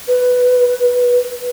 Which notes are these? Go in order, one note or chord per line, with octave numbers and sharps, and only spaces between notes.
B4